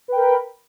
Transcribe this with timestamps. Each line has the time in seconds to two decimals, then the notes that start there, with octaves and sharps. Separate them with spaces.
0.08 B4
0.12 G5
0.16 A#4
0.20 B5